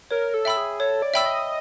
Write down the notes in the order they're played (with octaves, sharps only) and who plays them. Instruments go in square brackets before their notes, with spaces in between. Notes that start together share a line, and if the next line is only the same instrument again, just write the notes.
[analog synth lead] A#4 [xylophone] C#5
[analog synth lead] A4
[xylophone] E5 G5 B5 E6
[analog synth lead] G#4
[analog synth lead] A4 [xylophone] C#5
[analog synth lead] D5
[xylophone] E5 G5 B5 E6
[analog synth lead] D#5